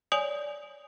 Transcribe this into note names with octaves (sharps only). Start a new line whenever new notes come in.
C#5 D5 G#5 D#6 F7 F#7